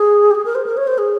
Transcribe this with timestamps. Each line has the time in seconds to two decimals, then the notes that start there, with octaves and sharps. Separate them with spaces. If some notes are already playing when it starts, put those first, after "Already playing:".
Already playing: G#4
0.31 G4
0.35 G#4
0.45 A#4
0.55 C5
0.66 A#4
0.77 C#5
0.87 C5
0.98 G#4